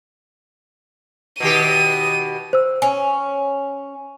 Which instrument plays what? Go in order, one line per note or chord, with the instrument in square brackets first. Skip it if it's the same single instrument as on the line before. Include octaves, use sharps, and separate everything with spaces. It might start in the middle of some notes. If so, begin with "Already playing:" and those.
[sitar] B2 D#3 G4 [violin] D#7
[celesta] C5 E6
[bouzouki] C#4 [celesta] G#5